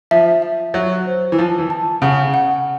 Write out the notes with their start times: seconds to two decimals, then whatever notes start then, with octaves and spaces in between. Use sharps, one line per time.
0.11 F3 E5
0.42 E5
0.74 F#3 E5
1.06 C5
1.32 E3
1.38 F3 A5
1.59 E3
1.70 A5
2.02 C#3 F#5
2.34 F#5